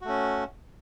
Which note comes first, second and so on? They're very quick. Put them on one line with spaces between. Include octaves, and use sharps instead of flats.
F#4 A3 C#4